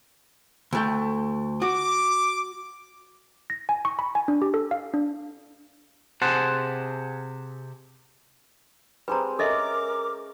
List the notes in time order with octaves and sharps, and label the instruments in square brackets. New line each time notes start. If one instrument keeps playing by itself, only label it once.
[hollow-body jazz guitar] D2 A3 G5
[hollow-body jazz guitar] F#4 [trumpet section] D6
[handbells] A#6
G#5
C#6
B5
G#5
D4
G4
A4
F5
D4
[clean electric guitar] C3 G#4 C5 F#5 A5
[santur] G3 G#3 C4 [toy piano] B4 A#5
[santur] C#4 [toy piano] A4 D#5 E5 [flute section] A#4 D6